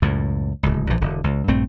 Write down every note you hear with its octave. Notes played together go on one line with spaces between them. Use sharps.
C#2 F#2 A2
D1 C#2
A#1 E3 F3
E1 D3
C#2
A#1 G2 A3 C4